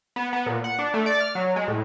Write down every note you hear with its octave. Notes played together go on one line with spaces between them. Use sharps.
B3
B3
A#2
F#5
D4
A3
D5
F6
F#3
G#3
A2